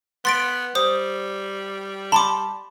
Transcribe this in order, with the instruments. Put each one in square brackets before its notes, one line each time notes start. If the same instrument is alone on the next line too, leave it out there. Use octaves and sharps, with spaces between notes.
[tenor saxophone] B3 [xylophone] C6 A6 D7
[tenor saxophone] G3 [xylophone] C5 D#6
[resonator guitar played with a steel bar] A5 [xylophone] B5 C6 D6